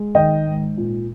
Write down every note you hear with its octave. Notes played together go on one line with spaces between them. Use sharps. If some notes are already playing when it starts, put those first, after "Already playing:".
Already playing: G#3
D#3 D#5 G5
G#2
A#2